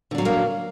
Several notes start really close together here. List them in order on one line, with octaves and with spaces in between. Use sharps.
D3 D4 F#3 A#2 A#3